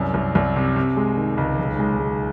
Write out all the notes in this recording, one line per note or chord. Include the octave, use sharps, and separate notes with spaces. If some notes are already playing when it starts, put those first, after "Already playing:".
Already playing: C2 F#2
C2
C2
C3
C3
G#3
D#3
C#2
B1
G#3
G#3